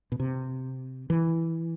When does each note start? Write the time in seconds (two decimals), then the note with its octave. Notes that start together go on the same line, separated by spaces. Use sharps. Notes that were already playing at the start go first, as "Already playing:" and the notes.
0.12 B2
0.20 C3
1.10 E3